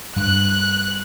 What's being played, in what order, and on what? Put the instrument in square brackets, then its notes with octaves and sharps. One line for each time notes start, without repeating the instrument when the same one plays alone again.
[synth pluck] G2 [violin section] F#6